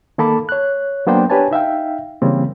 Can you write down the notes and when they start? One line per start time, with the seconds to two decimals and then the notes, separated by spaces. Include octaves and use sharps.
0.18 D#3 A#3 A4 A5 B5 D6
0.49 C#5 F#6
1.07 F#3 A#3 B3 D4 C5 G5
1.30 D4 G4 B4 C#5 G#5 A5
1.51 D#4 E5 F5 G5
2.22 C#3 E3 G3 A#3 C4 C#4